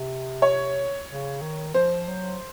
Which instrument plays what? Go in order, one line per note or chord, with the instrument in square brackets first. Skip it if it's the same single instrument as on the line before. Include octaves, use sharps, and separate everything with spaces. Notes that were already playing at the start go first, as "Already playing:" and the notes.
Already playing: [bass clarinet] C3
[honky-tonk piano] C#5
[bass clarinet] C#3
D#3
[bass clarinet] F3 [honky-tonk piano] C5
[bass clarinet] F#3